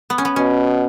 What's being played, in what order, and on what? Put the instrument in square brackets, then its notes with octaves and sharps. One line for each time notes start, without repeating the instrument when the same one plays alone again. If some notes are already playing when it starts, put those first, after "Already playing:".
[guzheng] B3
C#4
B3
[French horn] B2 [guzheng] C#4